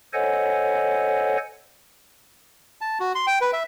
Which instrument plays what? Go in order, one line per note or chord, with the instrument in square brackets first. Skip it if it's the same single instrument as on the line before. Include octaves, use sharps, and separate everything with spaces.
[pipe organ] A4 C5 C#5 D#5 F#5 G#5
[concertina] A5
F#4
C6
G5
B4
E5